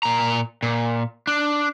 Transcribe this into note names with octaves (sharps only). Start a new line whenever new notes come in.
A#2 A#5
A#2
D4